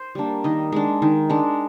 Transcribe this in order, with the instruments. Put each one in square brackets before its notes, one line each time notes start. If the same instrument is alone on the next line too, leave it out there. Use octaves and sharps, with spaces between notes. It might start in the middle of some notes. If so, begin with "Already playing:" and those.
Already playing: [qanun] C5
G3 A#3 D4
D#3 D#5
G#3 D4
D#3
G#3 D4